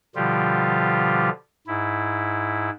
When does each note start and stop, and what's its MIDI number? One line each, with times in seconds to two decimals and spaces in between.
0.15 1.29 47
0.15 1.29 50
0.15 1.29 53
0.15 1.29 55
0.15 1.29 65
0.15 1.29 67
1.67 2.70 44
1.67 2.70 64